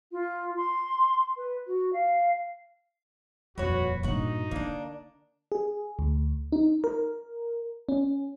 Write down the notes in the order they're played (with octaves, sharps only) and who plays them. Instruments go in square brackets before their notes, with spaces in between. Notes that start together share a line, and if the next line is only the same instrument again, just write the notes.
[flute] F4
C6
B4
F#4
F5
[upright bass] D#1 F2 [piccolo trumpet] F#4 [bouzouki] B4 C#5
[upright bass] G2 A#2 [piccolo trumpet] D#4 [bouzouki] F#4 F#5
[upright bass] D3 [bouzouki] A#3 D4
[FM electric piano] G#4
D2
D#4
A#4
C#4